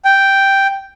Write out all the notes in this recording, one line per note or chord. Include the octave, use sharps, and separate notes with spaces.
G5